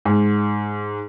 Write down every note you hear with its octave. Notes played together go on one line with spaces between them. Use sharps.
G#2